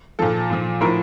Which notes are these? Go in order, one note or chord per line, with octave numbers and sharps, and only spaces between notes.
A#2 F3 A4
A#2 F3
A2 F3 A#4